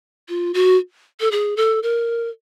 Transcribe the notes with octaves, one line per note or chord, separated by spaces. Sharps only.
F4
F#4
A4
G#4
A4
A#4